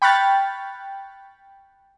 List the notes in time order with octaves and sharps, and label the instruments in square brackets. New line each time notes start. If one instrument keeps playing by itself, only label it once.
[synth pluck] G5 B5 C#6 F6 F#6 A6